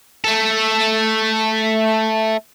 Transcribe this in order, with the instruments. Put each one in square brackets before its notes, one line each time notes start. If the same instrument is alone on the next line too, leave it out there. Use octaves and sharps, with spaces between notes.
[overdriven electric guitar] A3 A4